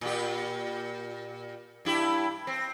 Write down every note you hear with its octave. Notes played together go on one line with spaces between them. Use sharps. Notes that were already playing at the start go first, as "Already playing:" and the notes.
A#2 G4
G2 E4 G4
C4